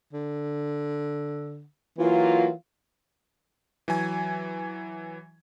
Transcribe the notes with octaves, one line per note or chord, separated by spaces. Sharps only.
D3
E3 F#3 A#3 F4
E3 F#3 G#5 G#6